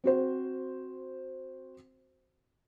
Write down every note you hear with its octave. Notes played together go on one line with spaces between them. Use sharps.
C4 F#4 C5